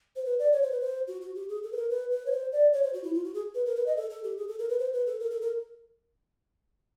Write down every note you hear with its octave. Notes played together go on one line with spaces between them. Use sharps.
C5
B4
D5
C#5
C5
B4
C5
F#4
F#4
G4
G#4
A4
B4
A#4
B4
B4
C#5
C5
D5
C#5
C5
F#4
E4
F4
F#4
G#4
B4
A#4
B4
D#5
A4
A4
G4
G#4
A4
A#4
B4
C5
B4
A4
A#4
A4
A#4